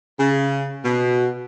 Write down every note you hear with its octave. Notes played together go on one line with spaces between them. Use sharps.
C#3
B2